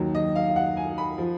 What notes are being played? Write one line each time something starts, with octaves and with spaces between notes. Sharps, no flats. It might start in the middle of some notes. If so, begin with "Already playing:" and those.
Already playing: D#2 D#3 F#3
D#5
F5
F#5
G#5
B5
F3